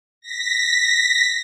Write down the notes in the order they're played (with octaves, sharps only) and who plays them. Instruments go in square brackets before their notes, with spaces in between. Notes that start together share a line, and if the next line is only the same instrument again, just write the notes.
[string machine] A#6 B6